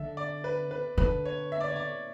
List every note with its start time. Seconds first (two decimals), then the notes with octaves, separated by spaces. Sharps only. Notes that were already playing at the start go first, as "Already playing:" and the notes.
Already playing: D3 E5
0.17 D5
0.44 B4
0.71 B4
0.98 D3 B4
1.25 C#5
1.52 E5
1.60 D5
1.68 C#5
1.76 D5